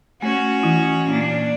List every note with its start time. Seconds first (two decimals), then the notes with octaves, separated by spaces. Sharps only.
0.22 A3 C#4 F#4
0.63 E3 E4
1.10 A#2 D4